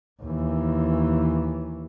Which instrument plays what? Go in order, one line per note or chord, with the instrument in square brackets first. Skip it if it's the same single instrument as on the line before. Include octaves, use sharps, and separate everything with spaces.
[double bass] D#2 E3